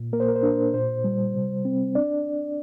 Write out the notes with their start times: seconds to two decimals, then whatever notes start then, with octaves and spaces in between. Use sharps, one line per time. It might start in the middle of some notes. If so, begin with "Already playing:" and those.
Already playing: A#2
0.13 A#3 A#4
0.20 C5
0.28 A#4
0.36 C5
0.43 D4 A#4
0.74 A#2 C5
1.04 G3
1.34 C3
1.65 C4
1.95 D4 D5